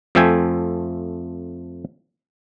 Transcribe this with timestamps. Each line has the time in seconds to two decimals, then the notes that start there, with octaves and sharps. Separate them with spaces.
0.15 F2 F3 A3 E5 G5 G#5